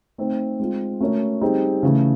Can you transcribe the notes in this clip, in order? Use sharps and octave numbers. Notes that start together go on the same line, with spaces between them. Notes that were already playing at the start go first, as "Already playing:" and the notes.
A3 C4 D#4
G#3 C4 F4
A3 C#4 F#4 A#4 C#5
G3 C4 D#4 G#4
C#3 E3 A3